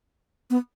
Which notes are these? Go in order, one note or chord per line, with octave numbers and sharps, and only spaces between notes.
B3